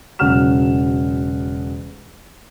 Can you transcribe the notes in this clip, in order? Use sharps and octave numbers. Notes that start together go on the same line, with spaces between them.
E1 C#3 F#3 F#5 F6 E7